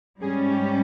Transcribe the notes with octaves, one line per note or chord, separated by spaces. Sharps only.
G#2 G3 C#4 G#4
G4